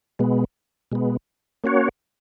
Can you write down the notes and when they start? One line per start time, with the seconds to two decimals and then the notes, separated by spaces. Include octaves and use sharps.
0.19 B2 G#3 B3
0.92 B2 G#3 B3
1.64 A#3 C#4 F#4 C#5